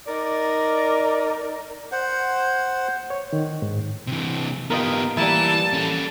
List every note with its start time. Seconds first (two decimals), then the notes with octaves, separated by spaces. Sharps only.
0.07 D#4 A#4 D5
1.92 C5 F#5
3.10 C#5
3.33 D#3
3.62 G#2
4.07 C3 E3
4.70 B3 D#4 F4 G4 A#4
5.17 E3 G3 A#3 E4 A5
5.73 C#4 A4